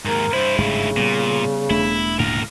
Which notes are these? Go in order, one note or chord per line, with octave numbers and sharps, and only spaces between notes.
D#2 G#2 A#4
G2 E4 C5
G1 G#2 C#3 A3
A#2 G3 B3
E1 A3 D4 E4
C#2 A2 D3 A#3 A#4